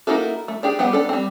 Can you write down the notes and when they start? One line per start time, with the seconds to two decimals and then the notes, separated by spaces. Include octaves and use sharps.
0.07 A#3 D#4 E4 F#4 A4
0.48 A3
0.63 D4 G4 G#4
0.79 G3 B3 G4 F#5
0.93 D4 A4
1.09 G3 C4